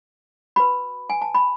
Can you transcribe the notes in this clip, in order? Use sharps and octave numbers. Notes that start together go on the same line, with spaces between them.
F#4 B4 B5
G#5
A5
B5